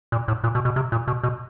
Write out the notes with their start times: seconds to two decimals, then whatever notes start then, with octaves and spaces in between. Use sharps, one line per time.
0.12 A#2
0.28 A2
0.44 A#2
0.55 B2
0.65 B2
0.76 C3
0.92 A#2
1.08 B2
1.23 B2